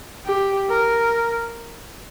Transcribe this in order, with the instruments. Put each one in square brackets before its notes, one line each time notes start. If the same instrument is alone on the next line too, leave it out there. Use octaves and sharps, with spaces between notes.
[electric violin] G4
A#4